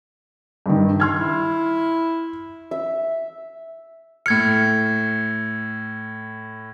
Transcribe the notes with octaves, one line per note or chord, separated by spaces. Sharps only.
G2 D#3
C6 F6 G#6
E4
E5
A2 F6 G#6 C#7